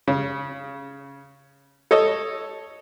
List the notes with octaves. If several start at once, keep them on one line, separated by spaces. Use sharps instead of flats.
C#3
A4 C#5 D#5